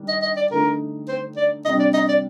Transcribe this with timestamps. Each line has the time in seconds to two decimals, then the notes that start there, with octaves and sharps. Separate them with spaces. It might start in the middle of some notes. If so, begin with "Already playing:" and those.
Already playing: D#3 G3 D4
0.08 D#5
0.22 D#5
0.37 D5
0.50 D3 A3 D#4 A#4
1.09 C5
1.37 D5
1.65 C3 G3 D4 D#5
1.80 D5
1.94 D#5
2.09 D5